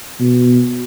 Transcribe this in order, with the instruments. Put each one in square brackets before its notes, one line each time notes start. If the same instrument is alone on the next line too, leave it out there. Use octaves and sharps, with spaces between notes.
[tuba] B2